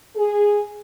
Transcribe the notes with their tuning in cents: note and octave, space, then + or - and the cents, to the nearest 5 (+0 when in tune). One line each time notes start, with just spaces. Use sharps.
G#4 -5